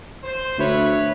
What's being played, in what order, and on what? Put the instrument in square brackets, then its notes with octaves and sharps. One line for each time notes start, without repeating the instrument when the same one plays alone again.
[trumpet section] C5
[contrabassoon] D2 [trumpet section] B4 C#5 [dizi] E5